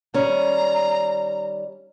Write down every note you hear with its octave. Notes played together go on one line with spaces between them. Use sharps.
D#3 G3 C#4 D5 A#5